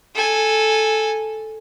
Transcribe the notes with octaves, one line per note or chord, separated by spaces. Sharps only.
A4 G#5